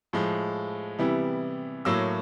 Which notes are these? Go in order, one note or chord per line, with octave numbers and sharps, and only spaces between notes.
A2 F3 G#3
C3 E3 G3 B3 E4
A2 F#3 A#3 E6